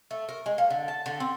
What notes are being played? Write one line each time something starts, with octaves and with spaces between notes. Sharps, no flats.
A3
A#4
G#3
A#3
D3
A5
D3
C4